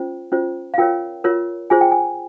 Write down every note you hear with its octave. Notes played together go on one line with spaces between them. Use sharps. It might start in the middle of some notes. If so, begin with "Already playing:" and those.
Already playing: C#4 F4 C5
C#4 F4 C5
F5
F4 A#4 C#5 G5
F4 A#4 C#5
F4 G#4 C5 G#5
G5
G#5